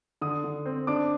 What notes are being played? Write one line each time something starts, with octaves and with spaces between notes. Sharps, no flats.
D3 D#6
D3
C4
D4 D6